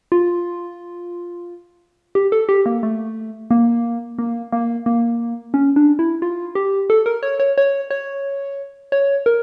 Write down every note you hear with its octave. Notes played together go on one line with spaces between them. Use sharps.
F4
G4
A4
G4
A#3
A3
A#3
A#3
A#3
A#3
C#4
D4
E4
F4
G4
A4
A#4
C#5
C#5
C#5
C#5
C#5
A#4